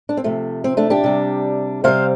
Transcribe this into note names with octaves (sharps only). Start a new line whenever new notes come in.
D4
C4
C3 F3 A3
C4
A3 D4
D4 G4
C3 G3
C3 G3 C5 F5